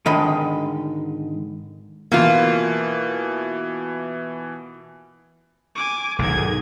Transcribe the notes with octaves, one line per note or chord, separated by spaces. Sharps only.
G#2 D3 D#3 G#3 D#5 B5
B2 E3 A#3 F4
G#5 D6
B1 G#2 D#3 G#4 G#6